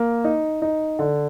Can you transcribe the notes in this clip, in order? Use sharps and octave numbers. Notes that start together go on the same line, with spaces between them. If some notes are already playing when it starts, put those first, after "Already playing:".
Already playing: A#3
D#4
D#4
D3